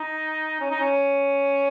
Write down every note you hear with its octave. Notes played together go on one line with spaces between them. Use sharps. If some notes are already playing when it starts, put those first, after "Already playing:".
Already playing: D#4
C#4
D#4
C#4